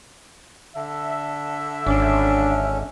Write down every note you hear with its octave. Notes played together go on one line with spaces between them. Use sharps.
D3 E5
G#1 C#4 D4